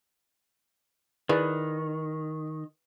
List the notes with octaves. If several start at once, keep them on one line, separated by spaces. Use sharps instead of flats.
D#3 E4 G#4 B4 D5